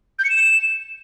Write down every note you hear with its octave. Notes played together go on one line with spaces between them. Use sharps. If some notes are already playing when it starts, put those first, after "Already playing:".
G6
C#7
E7